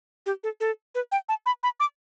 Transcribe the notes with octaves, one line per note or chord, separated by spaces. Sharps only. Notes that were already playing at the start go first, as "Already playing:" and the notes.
G4
A4
A4
B4
G5
A5
B5
B5
D6